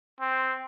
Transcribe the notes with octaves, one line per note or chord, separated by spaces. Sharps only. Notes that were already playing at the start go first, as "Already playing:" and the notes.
C4